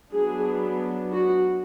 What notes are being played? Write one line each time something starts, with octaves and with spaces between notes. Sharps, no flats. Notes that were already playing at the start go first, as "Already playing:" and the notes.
F#3 B3 D4 G#4
F#4